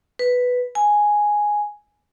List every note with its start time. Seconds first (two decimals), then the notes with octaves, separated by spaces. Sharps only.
0.19 B4
0.75 G#5